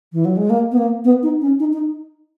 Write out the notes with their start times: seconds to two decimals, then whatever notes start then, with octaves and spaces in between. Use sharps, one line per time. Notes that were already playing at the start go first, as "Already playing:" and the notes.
0.13 E3
0.25 F#3
0.37 G#3
0.50 A#3
0.72 B3
0.78 A#3
1.04 B3
1.23 D#4
1.41 C#4
1.60 D#4
1.73 D#4